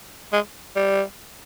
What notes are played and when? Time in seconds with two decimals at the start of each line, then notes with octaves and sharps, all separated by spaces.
0.33 G#3
0.76 G3